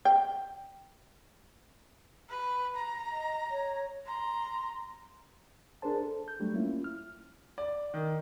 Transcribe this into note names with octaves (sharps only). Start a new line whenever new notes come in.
G5
B4
A#5
D#5
C#5
A#5 C6
D4 G#4 A#4 C5 A5
A4
G6
F#3 G3 A3 D4
A#3 C#4 E4 F4
F6
D5
D#3